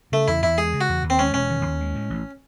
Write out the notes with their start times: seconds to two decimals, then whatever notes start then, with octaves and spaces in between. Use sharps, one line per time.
0.12 C#3 A3
0.28 E2 E4
0.43 E2 E4
0.58 G#3 G#4
0.73 C#3
0.81 F#4
0.89 E2
1.04 D#2
1.10 C4
1.19 G#3 C#4
1.34 E1 C#4
1.50 D#3
1.65 D#2
1.81 G#3
1.95 A2
2.10 A1